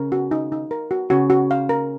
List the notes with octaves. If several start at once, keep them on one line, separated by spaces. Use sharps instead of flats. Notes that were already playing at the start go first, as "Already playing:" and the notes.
Already playing: C#3 A#4
F#4
D#4
D#4
A#4
F#4
C#3 F#4
F#4
F5
A#4